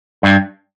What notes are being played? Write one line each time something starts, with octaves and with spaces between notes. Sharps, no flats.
G2